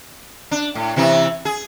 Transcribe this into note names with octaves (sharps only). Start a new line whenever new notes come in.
D4
A2
C3 E3 E4
G#4